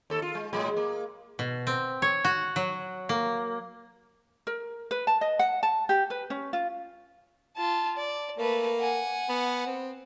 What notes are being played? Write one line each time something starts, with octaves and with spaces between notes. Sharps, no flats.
D#2 A4
F4
G#3
A2 F#3 G#3
A#3
B2
C4
C#5
F#4
F#3
A#3
A#4
B4
A5
D#5
F#5
A5
G4
B4
C#4
F4
F4 A5
D5
A3 A#3 B4
F#5 G#5
B3
C4